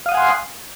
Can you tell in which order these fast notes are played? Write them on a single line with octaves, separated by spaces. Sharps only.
F5 D#6 F#5 G#5 C6